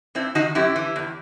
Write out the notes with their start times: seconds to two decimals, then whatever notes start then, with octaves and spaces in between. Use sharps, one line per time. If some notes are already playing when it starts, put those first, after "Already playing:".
0.15 G2 C4 E4
0.35 D#3 D#4 F#4
0.55 F#2 E4 G4
0.76 E3
0.96 E2